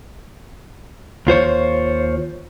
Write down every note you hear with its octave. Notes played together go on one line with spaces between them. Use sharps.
D#2 F4 C5 C#5